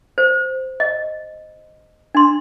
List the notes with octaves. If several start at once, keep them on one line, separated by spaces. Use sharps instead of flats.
C5
D#5
D4 C6